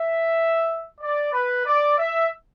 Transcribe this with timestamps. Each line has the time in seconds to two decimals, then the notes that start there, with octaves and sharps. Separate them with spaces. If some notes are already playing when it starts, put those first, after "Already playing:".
Already playing: E5
1.01 D5
1.33 B4
1.66 D5
1.99 E5